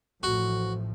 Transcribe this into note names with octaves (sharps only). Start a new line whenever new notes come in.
A1 A2 F3 F#4